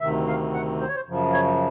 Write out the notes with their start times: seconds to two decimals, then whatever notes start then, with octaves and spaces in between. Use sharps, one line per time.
0.01 D2 C3 D#3 E5
0.28 F5
0.54 F#5
0.80 C5
0.88 C#5
0.96 C5
1.07 F#2 C#3 F3
1.33 C#5